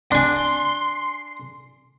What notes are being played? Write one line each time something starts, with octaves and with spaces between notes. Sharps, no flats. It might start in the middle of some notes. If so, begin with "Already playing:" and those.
D4 G#5 C6